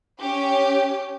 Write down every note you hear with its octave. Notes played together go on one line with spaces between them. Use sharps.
C#4 G4